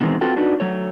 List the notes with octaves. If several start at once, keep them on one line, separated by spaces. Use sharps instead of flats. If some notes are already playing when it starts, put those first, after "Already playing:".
B2 D#3 E3 G#3 B3 C4
C4 F4 F#4 A4 B4 G5
D4 D#4 F#4 B4 D5
F#3 A3 C#5